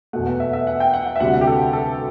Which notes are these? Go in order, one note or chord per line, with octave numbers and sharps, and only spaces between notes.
E2 B2 A3 F#5
F#5
E5
E5
F#5
G5
F#5
F#5
E5
D2 C3 G3 F#5
F#5
G4
A4
A4